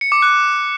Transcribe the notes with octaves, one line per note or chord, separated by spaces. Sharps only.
C#7
D6
F#6